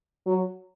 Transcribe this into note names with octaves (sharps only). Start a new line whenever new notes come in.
F#3